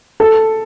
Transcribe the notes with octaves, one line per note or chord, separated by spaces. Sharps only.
A4